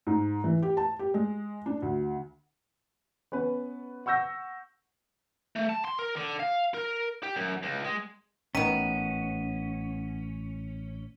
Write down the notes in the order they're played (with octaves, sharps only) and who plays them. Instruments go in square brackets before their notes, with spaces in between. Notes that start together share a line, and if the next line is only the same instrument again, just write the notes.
[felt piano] G#2
E3
G4
A5
G4
G#3
D4
D2
[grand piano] B3 C#4 B4
F#5 C#6 E6 G6 A#6
[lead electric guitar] A3
A5
C6
A#4
D3
F5
A#4
G4
F#2
C#2
G#3
[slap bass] A1 G#2 [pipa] D#3 B3 [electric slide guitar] C#4 [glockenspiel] B6 D#7